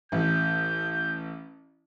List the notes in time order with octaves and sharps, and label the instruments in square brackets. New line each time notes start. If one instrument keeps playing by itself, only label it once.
[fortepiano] A1 [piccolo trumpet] G6